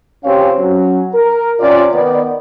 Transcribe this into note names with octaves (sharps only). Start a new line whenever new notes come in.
C#2 C4 C#4 G4 C#5 F5
F#3 C#4
A#4
C3 C#4 F4 D5
D#3 B3 D5